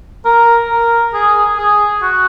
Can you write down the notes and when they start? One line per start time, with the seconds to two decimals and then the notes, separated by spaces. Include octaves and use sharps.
0.25 A#4
0.70 A#4
1.14 G#4
1.58 G#4
2.02 F#4